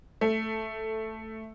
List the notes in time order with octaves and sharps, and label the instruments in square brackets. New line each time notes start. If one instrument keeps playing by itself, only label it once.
[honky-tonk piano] A3